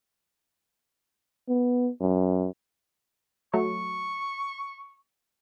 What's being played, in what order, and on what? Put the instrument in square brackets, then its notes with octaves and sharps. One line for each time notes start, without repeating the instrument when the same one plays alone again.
[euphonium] B3
F#2
[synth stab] F#3 A3 [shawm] C#6